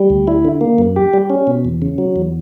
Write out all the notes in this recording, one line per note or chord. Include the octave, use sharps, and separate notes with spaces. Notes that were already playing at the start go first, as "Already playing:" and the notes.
Already playing: G3
D2
E4
D3
A#3
F#2
G4
G3
C#4
B2
E2
C#3
F#3
E2